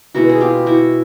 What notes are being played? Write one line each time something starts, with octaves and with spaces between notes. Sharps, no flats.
B2 G#3 B3 E4 F#4
G#4
F4 G4
E4 F#4